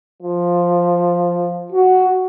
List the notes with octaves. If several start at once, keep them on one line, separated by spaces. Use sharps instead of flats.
F3
F#4